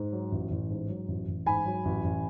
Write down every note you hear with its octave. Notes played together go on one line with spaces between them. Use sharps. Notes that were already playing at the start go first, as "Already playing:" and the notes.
Already playing: G#2
F#3
A1
A1
G#2
F#3
A1
A1
G#2 G#5 B5
F#3
A1
A1